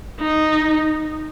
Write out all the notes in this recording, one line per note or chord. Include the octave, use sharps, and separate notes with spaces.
D#4